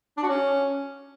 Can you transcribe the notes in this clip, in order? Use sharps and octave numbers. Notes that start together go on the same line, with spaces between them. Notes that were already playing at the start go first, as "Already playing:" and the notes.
D4
F#4
C#4